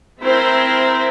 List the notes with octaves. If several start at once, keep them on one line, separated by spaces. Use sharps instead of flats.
C4 E4 A#4 C5